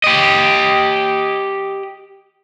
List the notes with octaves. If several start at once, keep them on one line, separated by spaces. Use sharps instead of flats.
G4 D#5